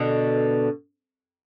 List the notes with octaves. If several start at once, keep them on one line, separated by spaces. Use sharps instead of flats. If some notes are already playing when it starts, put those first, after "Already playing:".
Already playing: B2 D3